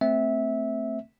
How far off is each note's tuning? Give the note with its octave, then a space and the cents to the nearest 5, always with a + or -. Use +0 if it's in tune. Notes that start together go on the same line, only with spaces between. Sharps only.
A3 +20 C4 +0 E5 -15